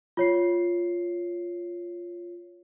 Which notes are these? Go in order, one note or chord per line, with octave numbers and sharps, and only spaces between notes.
F4 C#5 C7